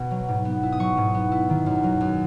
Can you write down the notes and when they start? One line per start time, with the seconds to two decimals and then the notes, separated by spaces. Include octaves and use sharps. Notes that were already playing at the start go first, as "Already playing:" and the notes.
Already playing: B2 B3
0.11 F#3
0.28 G#2
0.45 B3
0.63 E4
0.72 D#6
0.80 F#3 C#6
0.97 G#2
1.14 B3
1.32 E4
1.49 D#3
1.66 F#2
1.83 F#3
2.01 F#2